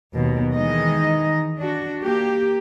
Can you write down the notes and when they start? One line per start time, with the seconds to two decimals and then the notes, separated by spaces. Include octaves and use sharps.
0.14 D#2 B2 F#3
0.55 D#3 E3 G#3 D#4 D#5
1.58 D4 F#4
2.03 A#3 G4